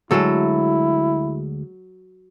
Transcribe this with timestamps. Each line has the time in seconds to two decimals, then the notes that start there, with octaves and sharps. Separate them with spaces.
0.11 D2 F#3 G#3 E4 A4